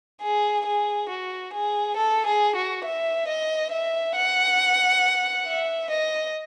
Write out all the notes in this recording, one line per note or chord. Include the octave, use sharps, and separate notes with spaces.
G#4
G#4
F#4
G#4
A4
G#4
F#4
E5
D#5
E5
F#5
E5
D#5